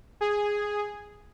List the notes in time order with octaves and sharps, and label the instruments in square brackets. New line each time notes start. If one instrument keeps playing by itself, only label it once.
[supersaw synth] G#4